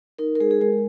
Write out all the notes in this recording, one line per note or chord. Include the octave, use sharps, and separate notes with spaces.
D#4 A#4
A#4
G#3 G#4
G#4
G#3 A#4